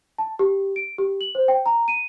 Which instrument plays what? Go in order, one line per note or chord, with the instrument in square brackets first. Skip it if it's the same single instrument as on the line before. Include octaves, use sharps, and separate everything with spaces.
[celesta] A5
G4
D7
G4
F#7
C5
G5
A#5
D#7